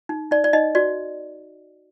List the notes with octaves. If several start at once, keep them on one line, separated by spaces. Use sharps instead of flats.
D#4
D#4 D5
D5
D#4 D#5
F#4 D5